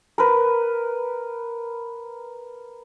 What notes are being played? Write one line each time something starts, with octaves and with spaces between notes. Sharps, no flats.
A#4 B4